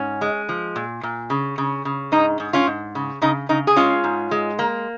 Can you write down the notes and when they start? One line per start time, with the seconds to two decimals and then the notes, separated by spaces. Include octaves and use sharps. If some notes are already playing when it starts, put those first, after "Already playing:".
Already playing: G#2 C#4
0.21 G#3
0.49 F3
0.76 A#2
1.03 A#2
1.30 C#3
1.58 C#3
1.85 C#3
2.12 G#2 D#4
2.40 G#2
2.53 C#4 F4
2.67 G#2
2.95 C#3
3.22 C#3 D#4
3.49 C#3 D#4
3.67 G#4
3.76 G#3 C#4 F4
4.04 G#2
4.31 G#3
4.59 A#3